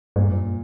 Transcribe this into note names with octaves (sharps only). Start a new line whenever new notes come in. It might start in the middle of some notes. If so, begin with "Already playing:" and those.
G2 A#2
F#2